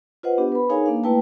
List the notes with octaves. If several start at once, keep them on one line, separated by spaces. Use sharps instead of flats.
F4 B4 C5 D#5 F#5
B3 D4 G4
B4 B5
D#4 G#4 A#4 C#5 F5 G#5
A#3 D4 F5
A3 A#3 E4 B4 G5 A5